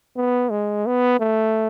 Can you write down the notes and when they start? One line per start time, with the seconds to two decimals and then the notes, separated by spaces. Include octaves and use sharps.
0.16 B3
0.51 G#3
0.86 B3
1.20 A3